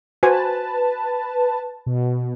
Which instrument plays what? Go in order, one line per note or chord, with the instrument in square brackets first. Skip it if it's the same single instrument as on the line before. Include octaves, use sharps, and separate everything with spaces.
[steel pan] F#4 C5 G#5 [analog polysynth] B4 A5
[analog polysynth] B2